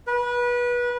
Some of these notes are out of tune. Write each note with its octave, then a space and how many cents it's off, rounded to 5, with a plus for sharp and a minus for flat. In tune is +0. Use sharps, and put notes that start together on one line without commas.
B4 -25